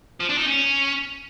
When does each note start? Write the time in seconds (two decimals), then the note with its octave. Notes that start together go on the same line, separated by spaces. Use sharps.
0.20 F3
0.29 D4
0.38 D#4
0.47 C#4